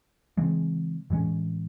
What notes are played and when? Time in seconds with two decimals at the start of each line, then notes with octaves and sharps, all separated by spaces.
0.37 C#3 E3 G#3 C4
1.10 A2 E3 G#3 C#4